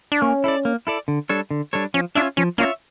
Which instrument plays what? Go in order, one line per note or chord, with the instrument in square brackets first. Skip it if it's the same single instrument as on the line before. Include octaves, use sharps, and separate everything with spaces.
[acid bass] D4
[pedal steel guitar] A#3 [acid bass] C#4
[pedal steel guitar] E4 A4 D5
A#3
E4 A4 D5
D3
G3 D4 A4 C#5
D3
G3 D4 A4 C#5
[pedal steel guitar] F3 [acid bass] C#4
[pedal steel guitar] C#4 F4 C#5 E5 [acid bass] D4
[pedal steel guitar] F3 [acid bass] C#4
[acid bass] A#3 [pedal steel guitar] C#4 F4 C#5 E5